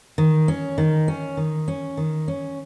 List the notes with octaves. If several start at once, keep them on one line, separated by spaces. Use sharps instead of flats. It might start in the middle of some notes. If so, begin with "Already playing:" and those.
D#3
C#4
D#3
C#4
D#3
C#4
D#3
C#4